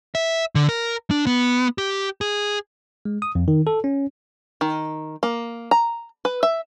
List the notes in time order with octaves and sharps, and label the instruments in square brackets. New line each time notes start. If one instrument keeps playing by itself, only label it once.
[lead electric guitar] E5
D3
A#4
D4
B3
G4
G#4
[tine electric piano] G#3
D#6
F2
D#3
A4
C#4
[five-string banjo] D#3
A#3
A#5
B4
E5